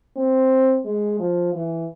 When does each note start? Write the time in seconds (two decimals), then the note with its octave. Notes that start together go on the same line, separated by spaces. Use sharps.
0.16 C4
0.85 G#3
1.19 F3
1.53 E3